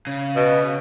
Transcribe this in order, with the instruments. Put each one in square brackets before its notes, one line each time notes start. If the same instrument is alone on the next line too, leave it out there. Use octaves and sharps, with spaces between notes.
[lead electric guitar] C#3
[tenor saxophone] B2